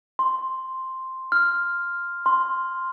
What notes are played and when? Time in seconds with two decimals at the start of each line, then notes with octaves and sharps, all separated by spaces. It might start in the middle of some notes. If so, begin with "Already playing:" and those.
0.19 C6
1.32 F6
2.26 C6